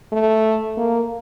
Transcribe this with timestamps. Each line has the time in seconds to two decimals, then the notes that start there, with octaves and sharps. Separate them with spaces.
0.12 A3
0.77 A#3